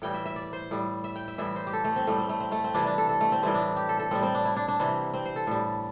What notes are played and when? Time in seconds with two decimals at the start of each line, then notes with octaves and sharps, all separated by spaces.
0.02 A2 E3 G3 G5
0.14 E5
0.26 E5
0.36 D5
0.53 C5
0.71 A2 G3
1.04 E5
1.16 G5
1.28 E5
1.38 A2 E3 G3 E5
1.56 C5
1.67 G4
1.73 A4
1.84 A3
1.96 C4
2.07 A2 G3 A3
2.18 C4
2.29 A3
2.40 C4
2.52 A3
2.64 C4
2.74 C3 E3 G3 D4
2.86 D4
2.98 A4
3.09 A4
3.21 A3
3.32 C4
3.43 A2 E3 G3 C4
3.54 D4
3.77 G4
3.89 A4
3.99 A4
4.11 A2 G3 C4
4.23 C4
4.35 D4
4.45 E4
4.56 D4
4.68 D4
4.80 C3 E3 G3 C4
5.14 C4
5.25 C5
5.36 A4
5.47 A2 G3